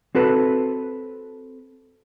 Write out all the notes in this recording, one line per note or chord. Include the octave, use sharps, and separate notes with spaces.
C4 F#4 A4 B4